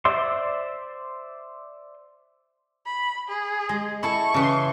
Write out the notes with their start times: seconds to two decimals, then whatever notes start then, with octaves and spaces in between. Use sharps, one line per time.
0.05 C5 D5 E5 C6
2.86 B5
3.29 G#4
3.69 G#3
4.03 E4 A4 A5 C#6
4.34 C#3 E3